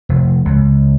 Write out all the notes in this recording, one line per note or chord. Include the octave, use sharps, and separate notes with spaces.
F1
C#2